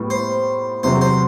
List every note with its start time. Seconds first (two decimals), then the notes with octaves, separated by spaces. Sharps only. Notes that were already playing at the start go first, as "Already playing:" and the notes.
Already playing: A2 G3 B3
0.10 C5
0.83 E2 C3 F#3 C4 C5
1.01 C5